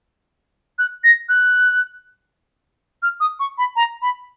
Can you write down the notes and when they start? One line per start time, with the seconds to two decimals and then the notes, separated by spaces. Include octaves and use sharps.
0.79 F#6
1.04 A#6
1.29 F#6
3.03 F6
3.20 D#6
3.40 C#6
3.58 B5
3.76 A#5
4.02 B5